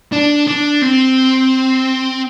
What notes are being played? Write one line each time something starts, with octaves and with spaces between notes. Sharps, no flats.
D4
D4
C4